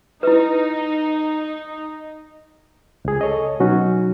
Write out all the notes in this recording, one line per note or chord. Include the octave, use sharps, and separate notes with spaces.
D#4 E4 B4
C#2 G#4
A4 C#5 D#5
B2 F#3 C#4 D#4 F#4